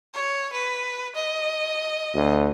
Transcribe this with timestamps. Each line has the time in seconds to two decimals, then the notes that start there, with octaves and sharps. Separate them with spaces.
0.14 C#5
0.52 B4
1.15 D#5
2.15 D2